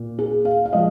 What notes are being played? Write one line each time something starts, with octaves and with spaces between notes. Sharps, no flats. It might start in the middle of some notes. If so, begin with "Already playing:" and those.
Already playing: A#2
G#4
F5
F5
F3 G#3 D#5